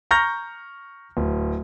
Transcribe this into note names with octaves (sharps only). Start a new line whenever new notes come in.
A#5 C#6 F6 G6 A#6
D1